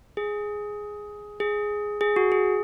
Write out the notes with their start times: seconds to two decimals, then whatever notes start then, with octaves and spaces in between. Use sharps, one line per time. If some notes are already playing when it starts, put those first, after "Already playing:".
0.17 G#4
1.40 G#4
2.01 G#4
2.16 F#4
2.32 G#4